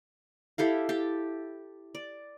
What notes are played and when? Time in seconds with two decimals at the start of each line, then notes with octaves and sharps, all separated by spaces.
0.58 E4 G4 A4 F5
0.89 G4 A5
1.95 D5